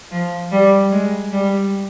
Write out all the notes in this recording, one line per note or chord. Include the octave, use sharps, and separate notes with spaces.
F3
G3
G#3
G3